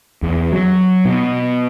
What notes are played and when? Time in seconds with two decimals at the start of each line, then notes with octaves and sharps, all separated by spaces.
0.23 E2
0.52 F#3
1.05 B2